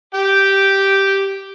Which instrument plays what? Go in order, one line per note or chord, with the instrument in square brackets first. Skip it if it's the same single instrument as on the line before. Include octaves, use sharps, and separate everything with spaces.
[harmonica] G4 G5